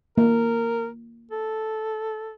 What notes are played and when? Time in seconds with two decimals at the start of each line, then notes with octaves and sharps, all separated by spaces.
0.18 A#3 A#4
1.31 A4